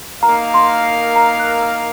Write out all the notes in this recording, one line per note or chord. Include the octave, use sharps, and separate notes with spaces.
A#3 D#4 A#4 F5 A#5
C6
A#5
F#6
F6